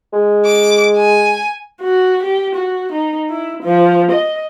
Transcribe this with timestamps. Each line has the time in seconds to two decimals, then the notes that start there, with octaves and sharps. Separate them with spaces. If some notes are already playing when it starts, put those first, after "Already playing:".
0.13 G#3
0.46 D6
0.97 G#5
1.82 F#4
2.23 G4
2.55 F#4
2.92 D#4
3.30 E4
3.63 F3
4.11 D#5